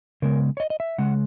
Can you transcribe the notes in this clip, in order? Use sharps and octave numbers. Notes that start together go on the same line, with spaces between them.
C#3 G#3 B3 A#4
C#5
D#5
D#5
E5
C#3 G#3 F#5